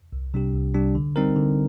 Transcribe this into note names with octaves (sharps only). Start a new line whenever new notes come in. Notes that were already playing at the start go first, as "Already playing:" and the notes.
C2
C3 G3 D4 G4
C2
C3 G3 D4 G4
D3
G3 C4 D#4 A#4
D3